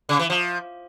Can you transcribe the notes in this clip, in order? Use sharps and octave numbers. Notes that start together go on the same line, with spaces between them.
C#3
E3
F3